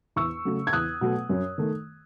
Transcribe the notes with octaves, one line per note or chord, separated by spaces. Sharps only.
E2 C#6 E6
C#3 F#3 A3
G#6
E2 D#6 F#6
B2 F#3 A3
F#2
D#3 A3